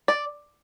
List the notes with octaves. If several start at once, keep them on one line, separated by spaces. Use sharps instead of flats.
D5